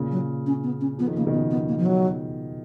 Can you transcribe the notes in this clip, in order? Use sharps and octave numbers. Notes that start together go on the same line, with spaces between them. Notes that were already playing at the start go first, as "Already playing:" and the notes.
Already playing: A#2 C#3
F#3
C#4
B3
C#4
F3 B3
D#3
C#3 A#3
B2 D#3
B3
B3
A#3
F3
F#3